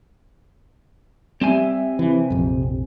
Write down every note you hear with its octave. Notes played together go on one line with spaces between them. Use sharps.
G3 C4 G4 E5 G#5
C3 E3
A#1 F2